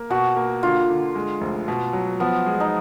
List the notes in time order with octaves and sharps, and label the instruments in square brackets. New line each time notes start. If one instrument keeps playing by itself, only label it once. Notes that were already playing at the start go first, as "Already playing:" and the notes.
Already playing: [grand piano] A#3
[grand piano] B2 [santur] F#4
[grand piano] A#3
[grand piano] D3 [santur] F4
[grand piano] D3
G#3
F1
B2
F#3
[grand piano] F3 [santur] B3
[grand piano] G#3
[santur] D#4